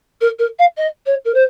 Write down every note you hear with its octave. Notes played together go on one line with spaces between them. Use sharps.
A#4
A#4
F5
D#5
C#5
A#4
C5